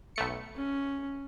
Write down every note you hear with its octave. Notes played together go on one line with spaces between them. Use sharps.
B1 A3 C#7
C#4